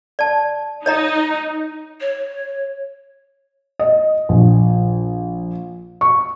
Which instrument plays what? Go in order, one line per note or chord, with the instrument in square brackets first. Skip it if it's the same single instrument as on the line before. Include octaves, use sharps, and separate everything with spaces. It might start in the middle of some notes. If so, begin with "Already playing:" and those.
[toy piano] D5 A5
[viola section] D#4 [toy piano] C#5 D#5 A#5
[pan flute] C#5
[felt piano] D#5
A#1
C#6